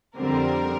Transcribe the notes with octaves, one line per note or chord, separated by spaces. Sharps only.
F2 D3 G3 C4 A#4